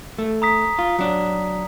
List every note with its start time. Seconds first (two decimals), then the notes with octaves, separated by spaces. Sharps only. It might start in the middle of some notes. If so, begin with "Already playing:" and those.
0.18 A3
0.42 A#5 D#6 B6
0.79 F4
0.99 F#3 D4